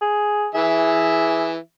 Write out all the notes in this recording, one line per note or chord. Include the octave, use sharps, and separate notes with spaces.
G#4
E3 G#4 E5